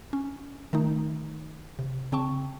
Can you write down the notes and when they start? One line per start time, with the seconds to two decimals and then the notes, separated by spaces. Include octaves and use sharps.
0.13 C#4
0.73 D#3 A3 D#4
1.79 C3
2.12 C#3 C4 G5 A5 C#6